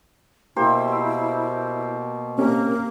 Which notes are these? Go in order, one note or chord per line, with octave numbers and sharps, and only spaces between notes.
B2 A#3 E4 G4 C5
A#3 C4 C#4 G4